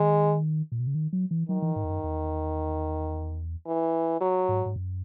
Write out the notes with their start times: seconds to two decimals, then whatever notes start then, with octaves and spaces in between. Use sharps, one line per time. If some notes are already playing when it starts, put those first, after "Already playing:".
Already playing: D#3 G#3
0.72 A#2
0.79 B2
0.87 C#3
0.95 D#3
1.13 F#3
1.31 E3
1.49 D#3 F#3
1.62 E3
1.76 G#2
1.84 E2
1.89 F#2
2.03 E2
3.67 E3
4.21 F#3
4.49 G#2
4.66 G#2
4.76 F#2